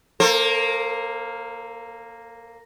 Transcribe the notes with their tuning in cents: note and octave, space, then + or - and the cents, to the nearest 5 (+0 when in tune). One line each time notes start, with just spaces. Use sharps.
A#3 +0 A4 +35 C5 +35